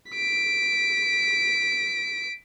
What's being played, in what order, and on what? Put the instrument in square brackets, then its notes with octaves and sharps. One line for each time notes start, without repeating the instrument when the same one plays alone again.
[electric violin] B6 D7